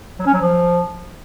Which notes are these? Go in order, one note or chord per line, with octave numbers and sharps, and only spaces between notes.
F#3
C#4
F#3
F3